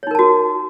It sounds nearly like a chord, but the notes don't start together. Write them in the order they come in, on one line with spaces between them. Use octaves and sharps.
C#5 D#4 A#4 A5 F#4